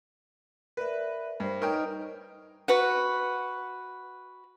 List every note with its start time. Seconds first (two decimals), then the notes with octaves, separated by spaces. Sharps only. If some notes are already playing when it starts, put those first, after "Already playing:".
0.77 A#4 B4 D5 E5
1.40 G2 A#4 C5
1.62 D#4 A#4 B4 C#5 D#5 G5
2.68 F#4 B4 F#5